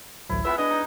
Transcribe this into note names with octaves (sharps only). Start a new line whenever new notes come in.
A1 D2 F#3 E4
G#3 B3 F4 B4 E5 F#5
D4 B4 D#5
D#4